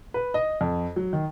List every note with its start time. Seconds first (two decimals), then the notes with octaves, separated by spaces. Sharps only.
0.14 B4
0.34 D#5
0.61 F2
0.96 F#3
1.13 D#3